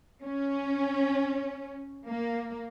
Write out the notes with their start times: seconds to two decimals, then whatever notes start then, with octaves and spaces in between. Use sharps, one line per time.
0.23 C#4
2.07 A#3